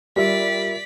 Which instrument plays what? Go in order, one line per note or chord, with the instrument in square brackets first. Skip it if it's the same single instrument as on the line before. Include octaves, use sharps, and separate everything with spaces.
[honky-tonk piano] G3 [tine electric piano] F4 A#4 E5 [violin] D5 B6